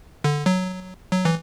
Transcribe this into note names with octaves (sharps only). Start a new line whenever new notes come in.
D3
F#3
F#3
E3